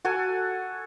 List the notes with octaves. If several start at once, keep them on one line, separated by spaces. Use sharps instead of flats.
F#4 A4 F#5 G#5